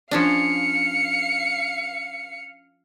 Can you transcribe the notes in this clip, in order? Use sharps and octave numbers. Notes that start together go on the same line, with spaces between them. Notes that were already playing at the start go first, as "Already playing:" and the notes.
F3 C#4 D4 F5 C#7